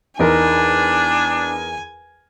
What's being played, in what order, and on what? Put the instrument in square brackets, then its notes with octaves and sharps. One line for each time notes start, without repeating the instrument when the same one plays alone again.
[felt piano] E2 [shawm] D4 [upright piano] D#4 A#4 [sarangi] G#5